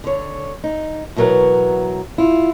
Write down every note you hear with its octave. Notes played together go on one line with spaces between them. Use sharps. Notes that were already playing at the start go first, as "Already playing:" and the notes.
D3 C#5
D#4
E2 B2 F#3 A#4 B4 F#5
E4 F4